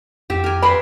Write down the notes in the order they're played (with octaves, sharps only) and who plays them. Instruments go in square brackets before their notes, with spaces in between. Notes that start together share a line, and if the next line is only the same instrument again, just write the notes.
[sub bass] F2 [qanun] G4 E5
[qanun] A#4 G#5
[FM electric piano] B4 [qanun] D5 E5 C6 [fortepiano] B5